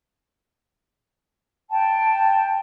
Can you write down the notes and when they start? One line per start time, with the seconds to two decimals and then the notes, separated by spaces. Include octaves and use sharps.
1.70 G5 A5